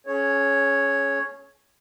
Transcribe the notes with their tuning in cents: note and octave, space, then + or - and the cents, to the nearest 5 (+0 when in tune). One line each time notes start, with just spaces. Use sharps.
C#4 +0 G#4 +40 C#5 +0